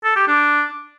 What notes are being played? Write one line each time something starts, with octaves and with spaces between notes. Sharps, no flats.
A4
G4
D4